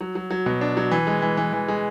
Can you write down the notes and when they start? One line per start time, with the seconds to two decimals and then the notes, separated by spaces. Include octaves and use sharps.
0.01 F#3
0.15 F#3
0.31 F#3
0.46 B2
0.61 D4
0.77 F#3
0.91 E3
1.07 G#3
1.22 E3
1.37 E3
1.53 E3
1.68 G#3